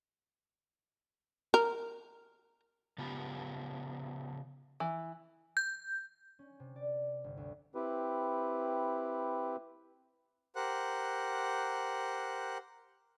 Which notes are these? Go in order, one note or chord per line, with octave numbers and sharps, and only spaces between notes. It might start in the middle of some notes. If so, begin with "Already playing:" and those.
A#4
C#3 B3 F4 G4
E3
G6
C#4
C3
D5
G1
D2
C4 E4 G4 B4
G4 A#4 C5 F#5 F#6